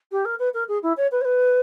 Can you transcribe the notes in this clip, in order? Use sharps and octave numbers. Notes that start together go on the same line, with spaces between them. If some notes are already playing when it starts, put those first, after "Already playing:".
G4
A#4
B4
A#4
G#4
E4
C#5
B4
C#5
B4